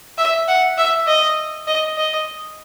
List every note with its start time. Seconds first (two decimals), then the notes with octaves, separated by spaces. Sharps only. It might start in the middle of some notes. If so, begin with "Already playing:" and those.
0.18 E5
0.48 F#5
0.78 E5
1.08 D#5
1.67 D#5
1.97 D#5